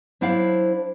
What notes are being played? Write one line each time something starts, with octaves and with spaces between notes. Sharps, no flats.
F#3 D4 E4 C5 D5 F5